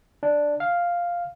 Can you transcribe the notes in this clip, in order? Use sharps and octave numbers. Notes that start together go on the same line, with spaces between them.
D4
F5